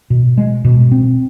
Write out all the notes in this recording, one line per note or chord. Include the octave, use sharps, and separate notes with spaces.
B2
G#3
B2
C4